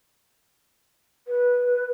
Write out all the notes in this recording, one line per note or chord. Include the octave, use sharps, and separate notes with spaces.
B4